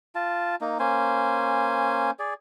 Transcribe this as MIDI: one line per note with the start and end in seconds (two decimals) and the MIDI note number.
0.15 0.55 65
0.15 0.55 81
0.61 0.78 58
0.61 0.78 63
0.79 2.11 58
0.79 2.11 61
0.79 2.11 72
0.79 2.11 80
2.19 2.34 68
2.19 2.34 74